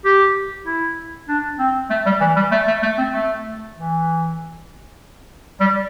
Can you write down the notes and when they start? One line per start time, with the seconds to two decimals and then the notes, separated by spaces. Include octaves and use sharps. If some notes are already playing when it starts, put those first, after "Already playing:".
0.05 G4
0.67 E4
1.29 D4
1.60 C4
1.90 A3
2.06 G3
2.21 E3
2.37 G3
2.52 A3
2.68 A3
2.83 A3
2.98 C4
3.14 A3
3.76 E3
5.60 G3